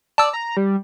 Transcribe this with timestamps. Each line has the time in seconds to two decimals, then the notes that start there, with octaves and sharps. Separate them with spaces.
0.18 D5 A5 E6
0.33 A#5
0.57 G3